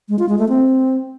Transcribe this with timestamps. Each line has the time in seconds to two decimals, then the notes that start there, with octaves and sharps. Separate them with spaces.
0.09 G#3
0.19 F4
0.29 G#3
0.39 A3
0.49 C4